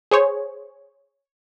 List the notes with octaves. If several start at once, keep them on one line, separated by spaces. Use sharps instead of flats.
G#4 C5 C#5